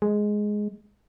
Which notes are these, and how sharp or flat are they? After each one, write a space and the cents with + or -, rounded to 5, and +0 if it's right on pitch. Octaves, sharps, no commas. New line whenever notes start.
G#3 +5